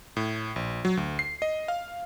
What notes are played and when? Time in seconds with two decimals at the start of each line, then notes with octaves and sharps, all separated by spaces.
0.17 A2
0.56 A#1
0.85 F#3
0.97 D2
1.19 C7
1.42 D#5
1.68 F5